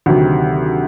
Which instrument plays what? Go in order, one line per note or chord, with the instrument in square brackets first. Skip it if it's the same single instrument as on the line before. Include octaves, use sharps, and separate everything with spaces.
[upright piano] D2 C3 D#3 F#3